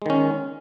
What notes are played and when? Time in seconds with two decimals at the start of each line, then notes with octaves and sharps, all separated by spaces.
0.02 G#3
0.06 D#3
0.10 C#4